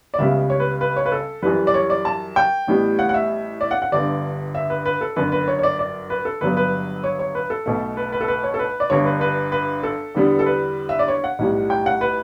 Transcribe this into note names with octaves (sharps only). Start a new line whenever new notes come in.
D5
C#2 C#3 G3 B3 E5
C#5
B4
B4
C#5
B4
A4
F#2 E3 G3 B4
D5
C#5
D5
A5
G5
A1 A2 G3 B3
F#5
F#5
E5
D5
F#5
F#5
G1 G2 D3 D5
E5
B4
B4
A4
G1 F#2 D3 B4
B4
C#5
C#5
D5
D5
B4
A4
G1 G2 F#3 B3 B4
B4
C#5
C#5
B4
A4
B1 B2 A3
B4
B4
A4
B4
C#5
A4
B4
D5
G1 G2 D3 C#5
B4
B4
B4
A4
E2 D3 G3 B3
A4
B4
E5
D5
C#5
F#5
B1 A2 G3
G5
F#5
B4